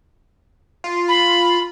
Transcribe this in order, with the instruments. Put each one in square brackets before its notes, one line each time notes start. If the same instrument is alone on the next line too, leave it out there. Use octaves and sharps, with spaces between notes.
[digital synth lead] F4
[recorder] B5